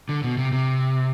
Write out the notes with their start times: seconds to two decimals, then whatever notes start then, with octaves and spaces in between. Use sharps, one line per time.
0.09 D3
0.24 B2
0.38 C3
0.52 C3